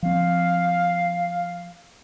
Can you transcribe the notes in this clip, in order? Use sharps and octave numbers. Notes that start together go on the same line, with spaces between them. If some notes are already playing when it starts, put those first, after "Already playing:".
F3 C4 F5